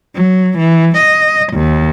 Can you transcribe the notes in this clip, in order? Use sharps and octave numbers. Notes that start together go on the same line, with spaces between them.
F#3
E3
D#5
D#2